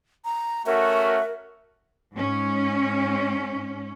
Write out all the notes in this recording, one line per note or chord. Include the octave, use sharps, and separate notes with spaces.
A#5
A3 C#4 F#4 A#4 E5
G#2 C#4